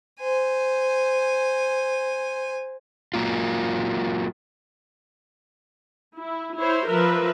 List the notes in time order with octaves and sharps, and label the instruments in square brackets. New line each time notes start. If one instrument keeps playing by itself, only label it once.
[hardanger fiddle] C5 G#5
[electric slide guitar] F#3 A#3 F4
[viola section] E4
E4 C5 C#5
F3 A#4 B4 E5